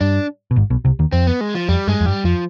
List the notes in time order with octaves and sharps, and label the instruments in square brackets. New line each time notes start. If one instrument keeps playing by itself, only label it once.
[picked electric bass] G2 [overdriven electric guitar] D4
[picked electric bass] B2
G#1 G#2
B1 B2
C2 C3
D#2 D#3
[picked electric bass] F2 [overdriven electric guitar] C4
[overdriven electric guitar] B3
G#3
F3
[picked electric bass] F2 [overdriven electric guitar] G3
[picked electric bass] G2 [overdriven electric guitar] G#3
[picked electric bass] F2
[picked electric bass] G2 [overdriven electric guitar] G3
[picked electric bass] F2 [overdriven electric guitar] F3